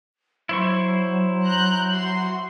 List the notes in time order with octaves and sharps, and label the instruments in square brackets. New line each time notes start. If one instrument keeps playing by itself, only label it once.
[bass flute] F#3 [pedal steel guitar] E4 C5 C#6
[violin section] A#5 F#6 G6
F#4 C6